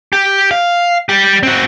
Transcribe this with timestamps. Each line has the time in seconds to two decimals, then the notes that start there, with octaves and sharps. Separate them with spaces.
0.13 G4
0.51 F5
1.09 G3 G4
1.43 C4 F#4